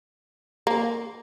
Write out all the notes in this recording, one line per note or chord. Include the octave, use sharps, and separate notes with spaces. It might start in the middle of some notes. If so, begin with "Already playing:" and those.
A#3